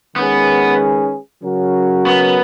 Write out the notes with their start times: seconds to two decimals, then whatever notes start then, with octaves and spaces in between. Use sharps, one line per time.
0.16 D#3 G#3 B3 C#4 G#4 B4
1.43 C#3 F#3 C#4 F#4 A#4
2.06 B3